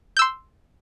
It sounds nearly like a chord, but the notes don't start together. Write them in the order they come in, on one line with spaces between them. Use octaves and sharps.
G6 E6 C6